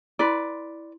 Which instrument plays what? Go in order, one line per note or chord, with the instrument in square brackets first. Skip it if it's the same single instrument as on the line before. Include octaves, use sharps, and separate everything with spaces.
[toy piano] E4 C6 [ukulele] B4 D5